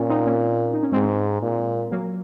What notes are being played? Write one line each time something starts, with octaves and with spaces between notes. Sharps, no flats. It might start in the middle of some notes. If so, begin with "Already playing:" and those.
Already playing: A#2 C#4 F4
C4 D#4
A#3 C#4
D#4
C#4
G#2 G#3 C4
A#2
F#3 A#3